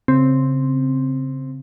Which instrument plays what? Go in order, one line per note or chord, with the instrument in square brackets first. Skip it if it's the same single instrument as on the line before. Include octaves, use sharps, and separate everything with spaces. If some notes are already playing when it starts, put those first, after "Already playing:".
[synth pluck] C#3 [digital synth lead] C4